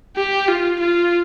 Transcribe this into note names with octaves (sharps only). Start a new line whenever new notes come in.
G4
F4
F4